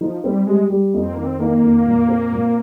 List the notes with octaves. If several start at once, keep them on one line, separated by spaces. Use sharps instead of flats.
F3 D#4
G3 C4
G3 G#3
G3
F2
C4
D#3 A#3
C4
D#3 A#3
F2
A#2
C4
A#2